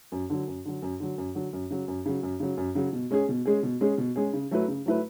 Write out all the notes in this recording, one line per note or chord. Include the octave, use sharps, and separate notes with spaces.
F#2
D3 F#3
F#2
D3 F#3
F#2
D3 F#3
F#2
D3 F#3
F#2
C#3 F#3
F#2
C#3 F#3
F#2
C#3 F#3
F#2
C#3 F#3
B2
G#3 C#4 G#4
B2
G#3 C#4 G#4
B2
G#3 C#4 G#4
B2
G#3 C#4 G#4
C#3
F#3 A3 E4 B4
C#3
F#3 A3 E4 B4